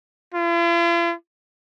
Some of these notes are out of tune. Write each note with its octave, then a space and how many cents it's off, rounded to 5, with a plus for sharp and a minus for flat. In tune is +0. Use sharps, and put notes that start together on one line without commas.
F4 -45